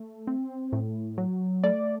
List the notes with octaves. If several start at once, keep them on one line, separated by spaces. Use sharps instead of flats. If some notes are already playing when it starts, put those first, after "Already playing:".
Already playing: A3
C4
A2
F#3
A3 D5